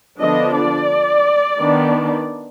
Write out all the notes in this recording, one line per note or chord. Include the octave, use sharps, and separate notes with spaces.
D3 F3 B3 D4 D#5
D5
D#3 B3 D4